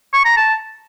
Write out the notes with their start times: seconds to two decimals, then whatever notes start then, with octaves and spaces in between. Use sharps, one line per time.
0.13 C#6
0.25 A#5
0.37 A5